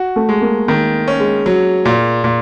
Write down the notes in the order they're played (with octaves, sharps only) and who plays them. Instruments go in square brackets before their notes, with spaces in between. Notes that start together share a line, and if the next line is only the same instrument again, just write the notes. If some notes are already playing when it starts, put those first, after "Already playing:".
Already playing: [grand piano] F#4
[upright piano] A3
[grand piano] G#3
[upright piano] A#3
[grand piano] D#3 [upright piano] A#3
[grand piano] C#4
[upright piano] G#3
[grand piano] F#3
A#2
A#2